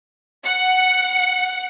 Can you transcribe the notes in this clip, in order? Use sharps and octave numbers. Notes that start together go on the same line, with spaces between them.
F#5